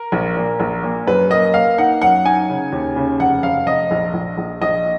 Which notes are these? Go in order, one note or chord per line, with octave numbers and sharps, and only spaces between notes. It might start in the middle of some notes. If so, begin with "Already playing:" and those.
Already playing: A#4
A#1
A#2
A#1
A#2
F#2 B4
A#3 D#5
A#3 F5
D#4 F#5
F#2 F#5
D#4 G#5
C#3
D#2
C#3
F1 F#5
F1 F5
F1 D#5
A#1
A#1
A#1
A#1 D#5